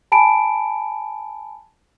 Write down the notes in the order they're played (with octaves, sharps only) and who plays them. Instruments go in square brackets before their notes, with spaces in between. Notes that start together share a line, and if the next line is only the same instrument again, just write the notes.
[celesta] G#5 A5 B5 D7